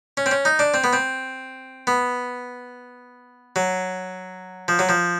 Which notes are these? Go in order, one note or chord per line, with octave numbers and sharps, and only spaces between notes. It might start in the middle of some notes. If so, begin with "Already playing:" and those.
C#4
C4
C#4
D#4
D4
C4
B3
C4
B3
F#3
F3
F#3
F3